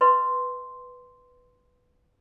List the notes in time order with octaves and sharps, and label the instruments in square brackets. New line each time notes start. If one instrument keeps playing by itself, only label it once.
[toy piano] B4 D#5 C6